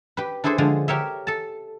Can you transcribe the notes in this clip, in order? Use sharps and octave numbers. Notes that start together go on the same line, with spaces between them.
G4 B4
D4 E4 G#4 A4 C5
D3 F3 G#3
G4 A#4 C#5 E5
A4 A5